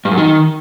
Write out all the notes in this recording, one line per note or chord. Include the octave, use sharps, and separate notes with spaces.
G2
F#2
D#3